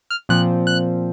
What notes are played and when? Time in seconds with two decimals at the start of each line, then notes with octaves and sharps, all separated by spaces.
0.10 F6
0.29 A#2 F3 C4 F#6
0.67 F#6